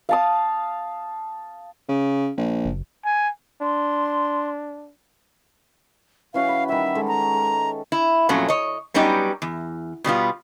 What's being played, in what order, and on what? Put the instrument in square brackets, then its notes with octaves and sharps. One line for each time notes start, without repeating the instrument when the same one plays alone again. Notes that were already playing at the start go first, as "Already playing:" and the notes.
[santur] F5 A5 D#6
[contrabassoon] C#3
A#1
[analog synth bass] F#1
[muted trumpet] G#5
[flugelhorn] D4 [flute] C6
[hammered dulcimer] E3 C#4 F#4 [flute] F5
[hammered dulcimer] B5
[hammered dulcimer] D#3 G3 [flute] E5
[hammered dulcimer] G#3 A4
[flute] A#5
[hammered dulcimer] A4
[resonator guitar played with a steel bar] E4
F2 A#2 F#3 A3 C#4
C#5 D#5
F#3 G3 B3 C#4 D#4 G4
E2
B2 G3 B3 F4